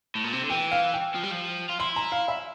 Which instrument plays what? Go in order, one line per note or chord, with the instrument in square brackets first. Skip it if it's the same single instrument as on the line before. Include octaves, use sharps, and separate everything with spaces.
[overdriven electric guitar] A2
A#2
C3
D3
[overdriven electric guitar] E3 [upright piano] G5
[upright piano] F5
G5
[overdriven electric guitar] F3
G3
F3
F4
[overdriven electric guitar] E4 [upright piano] C6
[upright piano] A#5
F5
E5